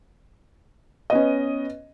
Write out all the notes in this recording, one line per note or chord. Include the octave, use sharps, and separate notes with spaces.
B3 C#4 D#5